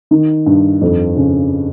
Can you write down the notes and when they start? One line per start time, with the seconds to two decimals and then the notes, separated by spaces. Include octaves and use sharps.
0.11 D#3
0.46 G2
0.82 F2
1.16 C#3